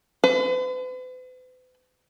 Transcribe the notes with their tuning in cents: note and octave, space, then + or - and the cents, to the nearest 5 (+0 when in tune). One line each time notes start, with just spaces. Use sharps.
B4 +45